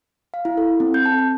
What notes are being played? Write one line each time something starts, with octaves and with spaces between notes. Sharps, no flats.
F5
E4
A4
C4
G6
A5
A5